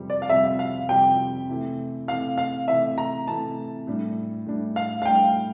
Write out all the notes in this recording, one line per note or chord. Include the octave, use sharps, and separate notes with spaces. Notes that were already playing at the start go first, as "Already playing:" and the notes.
Already playing: F2 C3 G3 C4 G4
D5
F5
F2 C3 G3 C4 G4 E5
F5
F2 C3 G3 C4 G4 G5
C3 E3 A3
C3 E3 A3 F5
F5
C3 E3 A3 E5
A#5
C3 E3 A3 A5
A2 G3 D4
A2 G3 D4
F5
F5
A2 G3 D4 G5